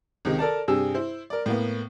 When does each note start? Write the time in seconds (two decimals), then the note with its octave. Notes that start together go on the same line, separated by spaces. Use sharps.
0.25 C#2 C3 D#3
0.39 A4 A#4 D5 A5
0.68 G2 C3 G4 G#4 E6
0.94 E4 C5
1.30 A#4 D5
1.46 A2 A#3 B3